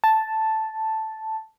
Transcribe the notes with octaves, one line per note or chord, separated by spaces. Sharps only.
A5